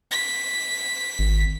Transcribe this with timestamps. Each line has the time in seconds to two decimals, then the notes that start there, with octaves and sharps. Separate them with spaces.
0.11 B6
1.19 G#1